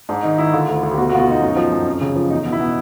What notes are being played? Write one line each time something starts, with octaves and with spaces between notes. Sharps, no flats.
G#2 D4
D#3 D#4
D#3 E4
D3 F4
D2
D2
G4
B2 F#4
F#4
B2 F4
F#4
B2 D#4
F#2
F3
F#2
F2
C#3
F3
E2 D#4
B2
E4
B2